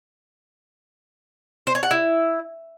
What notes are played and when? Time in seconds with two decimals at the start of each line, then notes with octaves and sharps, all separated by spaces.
1.67 C5
1.75 C#5
1.83 F#5
1.91 E4